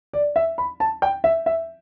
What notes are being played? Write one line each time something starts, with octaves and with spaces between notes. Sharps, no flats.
D5
E5
B5
A5
G5
E5
E5